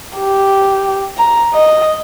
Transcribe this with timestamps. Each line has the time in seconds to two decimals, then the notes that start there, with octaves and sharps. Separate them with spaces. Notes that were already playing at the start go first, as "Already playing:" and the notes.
0.18 G4
1.18 A#5
1.54 D#5